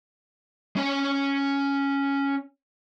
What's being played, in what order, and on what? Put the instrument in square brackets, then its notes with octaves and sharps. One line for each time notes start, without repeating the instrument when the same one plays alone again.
[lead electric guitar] C#4 G#5